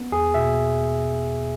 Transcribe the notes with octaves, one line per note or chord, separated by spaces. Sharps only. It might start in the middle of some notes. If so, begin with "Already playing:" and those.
Already playing: B3
E2 G#4
B2 E5